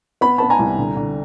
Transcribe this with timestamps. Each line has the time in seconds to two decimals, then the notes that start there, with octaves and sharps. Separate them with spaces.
0.21 B3 B5
0.38 B3 A5 B5
0.50 G#5 A#5
0.59 C2
0.79 D3
0.96 D3